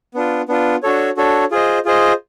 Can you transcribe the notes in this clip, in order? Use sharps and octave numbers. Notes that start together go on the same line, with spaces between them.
B3 D4 F4
B3 D4 F4
D4 F#4 A4 C#5
D4 F#4 A4 C#5
F4 G#4 C5 D#5
F4 G#4 C5 D#5